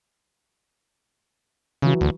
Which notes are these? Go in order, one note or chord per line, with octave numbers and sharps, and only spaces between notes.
C#3 E3 F#3
D2